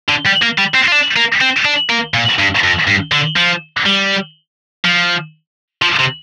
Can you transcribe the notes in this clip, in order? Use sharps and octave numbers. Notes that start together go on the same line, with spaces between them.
D3
G3
A#3
G3
C4
F4
D4
A#3
C4
D4
A#3
A#2
G2
F2
G2
D3
F3
G3
F3
F3
C3